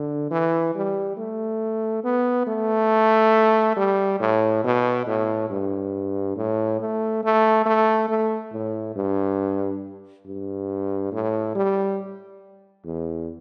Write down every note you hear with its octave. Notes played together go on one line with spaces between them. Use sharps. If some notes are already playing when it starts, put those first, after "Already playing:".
Already playing: D3
E3
G3
A3
B3
A3
G3
A2
B2
A2
G2
A2
A3
A3
A3
A3
A2
G2
G2
A2
G3
E2